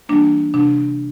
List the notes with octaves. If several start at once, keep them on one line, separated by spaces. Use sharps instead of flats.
E3 G3 A#3 D4
C3 D4